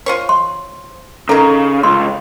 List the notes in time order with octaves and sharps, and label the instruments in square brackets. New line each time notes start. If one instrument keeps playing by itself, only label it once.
[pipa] F4 C5 C#5
[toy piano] C6
[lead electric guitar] C#3 [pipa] D#4 A#4 [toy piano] A4
[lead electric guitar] C#2 [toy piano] C6